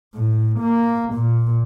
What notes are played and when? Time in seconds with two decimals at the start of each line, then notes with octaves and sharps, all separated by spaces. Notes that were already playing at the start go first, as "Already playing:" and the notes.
0.15 A2
0.60 A#3
1.14 A#2